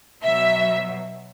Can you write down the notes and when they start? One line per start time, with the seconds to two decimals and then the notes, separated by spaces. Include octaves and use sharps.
0.23 B2 F#3 E5